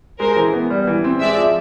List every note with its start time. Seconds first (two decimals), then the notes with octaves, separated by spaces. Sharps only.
0.19 G#3 A#4 C5
0.36 E3
0.53 B3
0.71 G3
0.87 E3
1.04 C4
1.20 G#3 D5 E5
1.38 F3